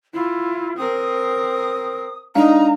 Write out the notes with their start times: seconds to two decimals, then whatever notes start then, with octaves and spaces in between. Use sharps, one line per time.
0.14 E4 F4
0.77 C4 A#4 D#6
2.35 G#3 D4 D#4 F5 A#5